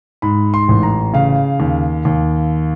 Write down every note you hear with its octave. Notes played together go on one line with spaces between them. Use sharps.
G#2 B5
C6
A1
A#5
C#3 F5
D#2
D#2